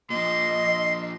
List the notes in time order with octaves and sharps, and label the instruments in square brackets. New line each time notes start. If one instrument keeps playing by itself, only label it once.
[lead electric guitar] A#2 F3 [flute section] D#5 [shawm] C6